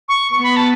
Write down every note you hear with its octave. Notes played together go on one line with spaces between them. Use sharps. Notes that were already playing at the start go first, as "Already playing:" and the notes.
C#6
B3 C#6
B5
A5